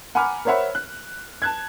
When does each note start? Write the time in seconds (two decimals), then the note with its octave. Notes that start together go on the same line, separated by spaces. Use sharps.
0.15 F#5 G#5 A#5 B5 D6 F6
0.45 A#4 C5 C#5 E5 F#5 B5
0.75 F#6
1.42 A5 F#6 G#6